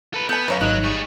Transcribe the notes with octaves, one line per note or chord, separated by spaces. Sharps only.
A4 B4
B3 A4 G#5 G6
F#2 B4 C#5 F5 A#5
G#1 F#3 D#4 D#6 F#6
G3 G#4 C#6